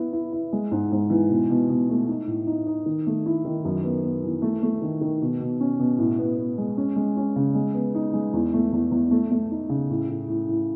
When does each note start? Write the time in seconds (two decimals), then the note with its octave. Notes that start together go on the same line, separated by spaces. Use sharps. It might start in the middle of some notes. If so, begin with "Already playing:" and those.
Already playing: B3 E4
0.13 E4
0.33 E4
0.53 G#3
0.71 G#2
0.92 G#2
1.10 E3
1.30 B2
1.50 B2
1.69 B2
1.89 A3
2.08 D#4
2.27 A2
2.47 D#4
2.66 D#4
2.86 D#3
3.06 A3
3.26 E4
3.45 D#3
3.65 F#2
3.84 B3
4.03 B3
4.24 E3
4.42 A3
4.63 A3
4.82 D#3
5.01 D#3
5.21 B2
5.40 B2
5.60 C#4
5.80 B2
5.98 A2
6.19 B3
6.37 B3
6.58 G#3
6.77 C#4
6.96 G#3
7.17 C#4
7.36 C#3
7.55 G#3
7.74 B3
7.95 D#4
8.13 G#3
8.33 E2
8.53 A3
8.73 E2
8.91 E2
9.11 A3
9.31 A3
9.51 D#4
9.69 C#3
9.90 A2
10.09 A2
10.28 A2
10.48 A2